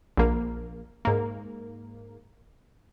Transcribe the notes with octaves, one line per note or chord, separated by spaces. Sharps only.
A#1 A#3
G#2 A#3